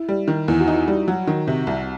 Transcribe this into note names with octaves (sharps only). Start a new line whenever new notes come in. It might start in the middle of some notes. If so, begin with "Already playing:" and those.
Already playing: E4
G3
D#3
E2 E4
F#4
D#4
E4
G3
F#3 F#4
D#3
C3
C2